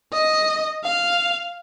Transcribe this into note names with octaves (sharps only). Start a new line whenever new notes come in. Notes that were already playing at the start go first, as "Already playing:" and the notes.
D#5
F5